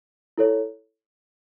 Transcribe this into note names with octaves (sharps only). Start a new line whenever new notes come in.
E4 A4 C#5